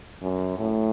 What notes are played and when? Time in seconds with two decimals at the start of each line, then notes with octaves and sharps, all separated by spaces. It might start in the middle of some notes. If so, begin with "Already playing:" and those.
0.21 F#2
0.59 A2